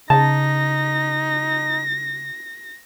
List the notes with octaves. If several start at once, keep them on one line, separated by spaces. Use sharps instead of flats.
C#3 D#4 A5 A#6